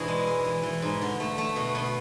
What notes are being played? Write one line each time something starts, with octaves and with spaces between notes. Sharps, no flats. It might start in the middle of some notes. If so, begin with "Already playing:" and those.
Already playing: G#2 B2 E3 D4 E4 G#4 D5
G#3
G#3
E3
E3
G#2
D3
A3
A3
B2
B2